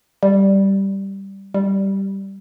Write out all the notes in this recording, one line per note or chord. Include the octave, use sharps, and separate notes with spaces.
G3
G3